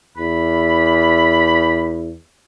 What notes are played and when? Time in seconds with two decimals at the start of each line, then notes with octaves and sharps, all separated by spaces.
0.17 E2 B5